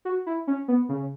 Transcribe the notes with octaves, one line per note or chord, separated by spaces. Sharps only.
F#4
E4
C#4
B3
C#3